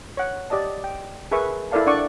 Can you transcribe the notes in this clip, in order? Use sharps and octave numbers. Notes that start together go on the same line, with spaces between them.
C#5 F#5
G4 D5 D#5 A5
G5
G#4 A#4 B4 E5 C#6
E4 A4 A#4 D5 F5 A5
D4 D5 F#5 C#6 D6